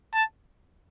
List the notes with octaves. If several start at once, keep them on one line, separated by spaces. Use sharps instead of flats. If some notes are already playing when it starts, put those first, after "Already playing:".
A5